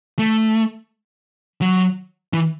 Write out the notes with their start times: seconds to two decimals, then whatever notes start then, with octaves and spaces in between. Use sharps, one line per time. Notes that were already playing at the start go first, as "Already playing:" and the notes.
0.19 A3
1.61 F#3
2.33 E3